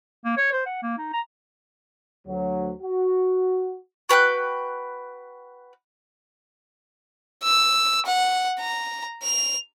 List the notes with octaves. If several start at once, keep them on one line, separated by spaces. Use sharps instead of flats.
A#3
C#5
C5
F#5
A#3
D#4
A#5
D2 F#3
F#4
F#4 B4 G5 F#6
E6
F#5
A#5
F7